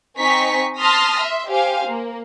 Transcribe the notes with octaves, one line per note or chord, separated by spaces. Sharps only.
C4 D#4 G#5 A#5 C#6 B6
A5 C6 D#6 F6 A#6 B6
E5 C6
G4 C5 F5 G#5
A#3